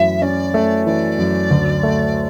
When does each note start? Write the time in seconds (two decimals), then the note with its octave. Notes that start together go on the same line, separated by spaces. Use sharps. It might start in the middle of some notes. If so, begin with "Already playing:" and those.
Already playing: F#2 E3 A3 E5
0.22 C#4 D5
0.54 A3
0.86 E3 D5
1.18 F#2
1.51 D2
1.83 A3